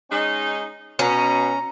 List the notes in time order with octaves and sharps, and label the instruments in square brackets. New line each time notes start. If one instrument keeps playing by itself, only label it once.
[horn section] G#3 C#4 D#4
[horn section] B2 [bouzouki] C#4 [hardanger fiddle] A#5